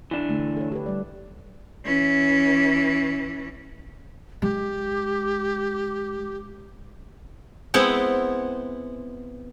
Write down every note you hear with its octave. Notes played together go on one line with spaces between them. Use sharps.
E3 D4
D3 A3
A4 C#5
G4 A4 B4
G3 D5
E3 C#4
G#3 G4
G#3 B3 C4 E4 F#5